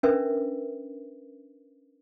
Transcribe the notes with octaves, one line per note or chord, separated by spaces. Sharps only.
C#4 D4 A#4 B4 E5